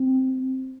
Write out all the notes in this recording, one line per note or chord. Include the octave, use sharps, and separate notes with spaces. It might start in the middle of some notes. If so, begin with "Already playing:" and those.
Already playing: C4